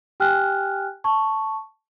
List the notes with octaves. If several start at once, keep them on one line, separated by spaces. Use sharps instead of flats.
G4 G5 G#5 F6 F#6
A5 C#6